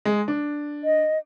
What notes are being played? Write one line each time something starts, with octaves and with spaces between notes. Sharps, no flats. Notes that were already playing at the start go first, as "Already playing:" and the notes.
G#3
D4
D#5